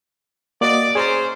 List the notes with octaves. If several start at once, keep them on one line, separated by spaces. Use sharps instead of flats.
A#3 F#4 D5 D#5
C#4 G#4 C5 A#5